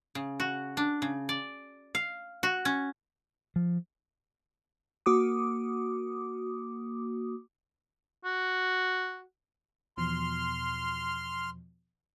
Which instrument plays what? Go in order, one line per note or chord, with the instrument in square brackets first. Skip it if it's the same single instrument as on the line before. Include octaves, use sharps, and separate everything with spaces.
[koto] C#3
F#4
D4
C#3
D5
F5
F#4
C#4
[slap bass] F3
[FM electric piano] A#3 F#4 D6 D#6
[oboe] F#4
[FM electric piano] E2 B2 F3 [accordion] C6 F6